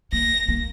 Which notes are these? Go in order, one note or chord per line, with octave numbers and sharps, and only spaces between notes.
A#3 A#6
A#3